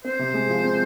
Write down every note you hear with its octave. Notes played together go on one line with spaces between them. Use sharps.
C4 C5
C3
G#3
F3
C4